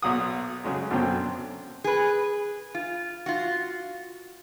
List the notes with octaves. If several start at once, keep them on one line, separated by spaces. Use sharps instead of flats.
B1 F#3 F#5 D#6
C#3 F#3 G#3
F#2 B2 D3 F#3 C4 G5
G#4 B4
F4
F4 F#4